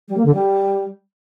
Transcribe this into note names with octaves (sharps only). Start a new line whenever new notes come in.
G3
A#3
D3
G3